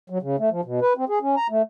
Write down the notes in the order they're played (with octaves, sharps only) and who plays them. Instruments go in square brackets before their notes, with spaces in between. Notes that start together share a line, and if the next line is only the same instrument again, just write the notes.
[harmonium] F#3
C#3
A3
F3
B2
B4
C4
G#4
C#4
A#5
A3